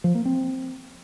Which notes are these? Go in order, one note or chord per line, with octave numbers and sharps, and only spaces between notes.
F3
A#3
C4